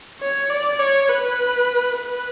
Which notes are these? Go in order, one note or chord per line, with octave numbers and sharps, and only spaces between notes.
C#5
D5
C#5
B4
B4